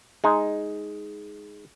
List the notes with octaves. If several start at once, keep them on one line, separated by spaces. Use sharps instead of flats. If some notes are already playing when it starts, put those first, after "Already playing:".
G#3 D#4